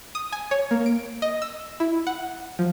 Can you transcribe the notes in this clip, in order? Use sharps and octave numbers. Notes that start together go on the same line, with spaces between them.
D#6
G#5
C#5
A#3
D7
D#5
E6
E4
F#5
F3